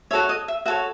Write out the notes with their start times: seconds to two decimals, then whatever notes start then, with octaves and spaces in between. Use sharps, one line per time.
0.11 F#4 A4 C#5 E5
0.29 D#5
0.48 E5
0.66 F#4 A4 C#5 E5